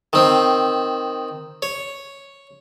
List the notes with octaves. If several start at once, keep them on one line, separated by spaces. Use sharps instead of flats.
D#3 C4
C#5